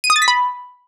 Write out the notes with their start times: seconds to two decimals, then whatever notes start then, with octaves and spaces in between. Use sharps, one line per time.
0.04 D#7
0.10 D#6
0.16 A6
0.22 B6
0.28 B5